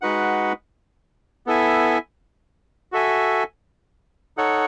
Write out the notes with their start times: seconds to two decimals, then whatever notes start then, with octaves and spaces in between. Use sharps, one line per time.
0.02 G#3 D#4 F#4 B4 F#5
1.46 B3 E4 A4 E5 G#5
2.92 F#4 A4 E5 G#5
4.37 D#4 A4 C#5 F#5